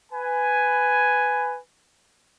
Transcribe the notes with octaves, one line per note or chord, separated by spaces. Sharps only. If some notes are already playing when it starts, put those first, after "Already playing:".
B4 G#5